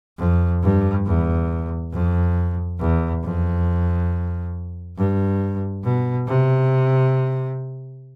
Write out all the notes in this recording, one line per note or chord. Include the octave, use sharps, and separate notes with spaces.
F2
G2
E2
F2
E2
F2
G2
B2
C3